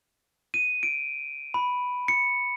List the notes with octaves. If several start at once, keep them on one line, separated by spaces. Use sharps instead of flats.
D#7
D7
B5
C#7